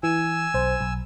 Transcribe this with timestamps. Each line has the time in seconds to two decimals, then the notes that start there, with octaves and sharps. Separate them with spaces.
0.03 E3 G#5 E6
0.54 B1 C5
0.81 B1